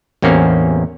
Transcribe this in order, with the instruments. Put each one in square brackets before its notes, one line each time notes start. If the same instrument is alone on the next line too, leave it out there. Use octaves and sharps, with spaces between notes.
[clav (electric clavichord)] A1 E2 A#3 C4 C#4